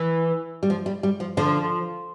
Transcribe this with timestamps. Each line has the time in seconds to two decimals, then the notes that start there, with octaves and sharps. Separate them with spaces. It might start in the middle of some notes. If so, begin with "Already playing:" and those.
Already playing: E3
0.63 G3
0.70 F3
0.86 G3
1.03 G3
1.20 F3
1.37 D3 F3